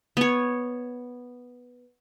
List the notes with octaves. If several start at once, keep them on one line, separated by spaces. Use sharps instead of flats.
B3 C#5